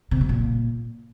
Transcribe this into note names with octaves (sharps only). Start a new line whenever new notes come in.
C3
B2
A#2